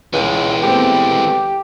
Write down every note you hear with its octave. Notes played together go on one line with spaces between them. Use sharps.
C#2 E3 G#3
A3 B3 C4 G4